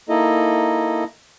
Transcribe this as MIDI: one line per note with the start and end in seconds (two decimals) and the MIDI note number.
0.09 1.04 58
0.09 1.04 63
0.09 1.04 64
0.09 1.04 69
0.09 1.04 75